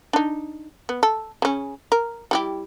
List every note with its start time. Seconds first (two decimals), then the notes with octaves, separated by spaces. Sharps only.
0.13 D4 D#4
0.89 B3
1.03 A4
1.42 C#3 C#4
1.92 A#4
2.31 G3 E4 G4